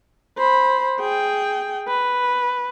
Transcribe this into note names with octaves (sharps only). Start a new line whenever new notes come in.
C5 B5
G#4 G5
B4